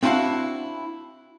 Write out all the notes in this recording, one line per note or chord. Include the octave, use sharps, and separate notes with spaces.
C4 D4 E4 F#4 F5 F#5